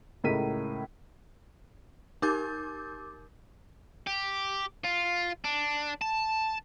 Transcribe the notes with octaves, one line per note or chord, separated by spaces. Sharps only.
C#2 A2 A#4 B6 D#7
D#4 G4 A#4 D6 G6 A6
G4
F4
D4
A5